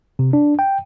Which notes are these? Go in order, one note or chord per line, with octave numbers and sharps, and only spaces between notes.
C3
D4
G5